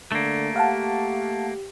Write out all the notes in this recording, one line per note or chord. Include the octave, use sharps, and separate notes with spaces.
D3 A3 A#3
G4 F5 F#5 A5